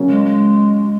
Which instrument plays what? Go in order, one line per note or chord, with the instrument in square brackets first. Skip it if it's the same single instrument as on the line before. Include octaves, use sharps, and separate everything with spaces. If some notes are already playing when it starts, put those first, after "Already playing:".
Already playing: [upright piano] C#3 F#3 A#3 C#4
[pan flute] G#3
G#3